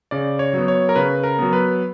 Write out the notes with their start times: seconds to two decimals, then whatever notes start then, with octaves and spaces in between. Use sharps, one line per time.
0.11 C#3 D5
0.39 C#5
0.53 F#3 B3
0.68 C#5
0.89 A#4
0.96 C#3 B4
1.24 A#4
1.39 F#3 B3
1.53 B4